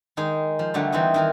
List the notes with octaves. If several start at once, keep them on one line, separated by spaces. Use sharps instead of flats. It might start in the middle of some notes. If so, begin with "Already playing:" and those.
D#3 G#3 D#4 G#4
F3
D3 F#3 G3 A3
E3 C4 D#4 D#5
D#3 E3 A#4